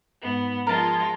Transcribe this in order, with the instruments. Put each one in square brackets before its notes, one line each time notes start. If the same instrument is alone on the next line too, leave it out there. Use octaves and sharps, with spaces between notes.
[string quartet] G#2 B3
[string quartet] F3 G#3 F4 [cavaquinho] A#4 A5